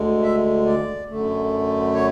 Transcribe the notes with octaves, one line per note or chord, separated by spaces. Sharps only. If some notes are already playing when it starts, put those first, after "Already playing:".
Already playing: D2 D3 G#3
E5
D5
F#2 D3 A3
C#5